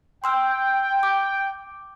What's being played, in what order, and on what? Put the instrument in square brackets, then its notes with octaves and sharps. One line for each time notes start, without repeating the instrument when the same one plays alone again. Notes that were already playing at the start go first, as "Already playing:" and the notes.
[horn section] G5 [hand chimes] C6 E6 F6
[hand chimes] D6